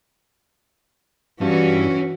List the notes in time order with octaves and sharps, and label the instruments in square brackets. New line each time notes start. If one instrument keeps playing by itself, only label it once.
[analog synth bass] G2 [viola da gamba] E3 E4 F#4 [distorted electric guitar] C#4